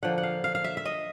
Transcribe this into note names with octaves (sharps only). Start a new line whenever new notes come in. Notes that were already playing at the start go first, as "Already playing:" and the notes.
D3 F3 A#3 F#5
F#5
F5
F5
F5
E5
E5
D#5